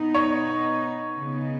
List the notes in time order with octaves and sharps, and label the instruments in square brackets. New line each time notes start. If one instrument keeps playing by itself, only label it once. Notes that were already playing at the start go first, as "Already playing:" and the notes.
Already playing: [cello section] B2 B3 D#4
[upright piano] C#5
[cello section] C#3 B3 D#4